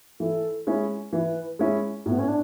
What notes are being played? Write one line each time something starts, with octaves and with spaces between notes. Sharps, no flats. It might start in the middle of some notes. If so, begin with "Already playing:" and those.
E3 A4
G#3 C#4 E4
E3 B4
G#3 C#4 E4
A2 B3
C#4
D4